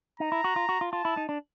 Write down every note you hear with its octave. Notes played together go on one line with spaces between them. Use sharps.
D#4 A#5
E4
F#4
F4
F#4
F4
F4 A5
E4
D#4
D4